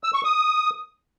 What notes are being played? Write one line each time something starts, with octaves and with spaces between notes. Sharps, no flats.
E6
C#6
D#6